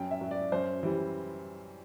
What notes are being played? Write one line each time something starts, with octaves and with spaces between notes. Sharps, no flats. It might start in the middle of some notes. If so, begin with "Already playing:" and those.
Already playing: F#2 G5
E5
F#3
D5
F#2 C5
E3 G3